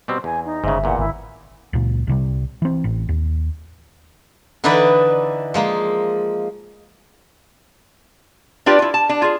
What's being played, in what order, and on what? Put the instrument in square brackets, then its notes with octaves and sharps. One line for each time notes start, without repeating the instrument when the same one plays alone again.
[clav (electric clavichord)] B2 G3 C4 [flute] C5
[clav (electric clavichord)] E2 [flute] G#5
[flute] D#4
[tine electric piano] G1 E5 [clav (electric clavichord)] G#2 C#3
[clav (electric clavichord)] E2 A#2 [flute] F#5
[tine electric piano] G#1 [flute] E4
[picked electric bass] C#2 A#2
C2 C3 G3
E3 C4
A1
D#2
[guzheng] D3 E3 D#4 E4 B4 D5
F3 G#3 A#3
[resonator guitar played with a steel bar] D4 F4 G4 B4 D5
E4 F4
A5
D4
F4 G#4